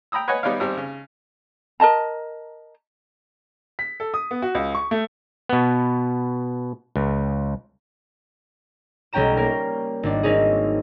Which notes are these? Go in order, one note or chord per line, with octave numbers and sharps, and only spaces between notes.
G5 A#5 B5 D#6 E6
B4 C#5 D#5 F#5 G#5
G3 B3 D#4 C#5 D5 F5
G#1 G3 C4
C#3
A#4 D#5 A5 A#5
B6
A4
D#6
B3
F#4
C#2
C#6
A3
B2 B3
C#2
B1 G3 C#4 G5 A#5 E7
A#3 A#4
G#1 D4
A#3 C4 C#4 D#4 G#4